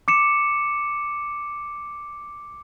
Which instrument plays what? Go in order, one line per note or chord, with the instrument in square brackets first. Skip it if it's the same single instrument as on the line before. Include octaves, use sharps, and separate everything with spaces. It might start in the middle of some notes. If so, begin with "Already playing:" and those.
[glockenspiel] D6 C#7 E7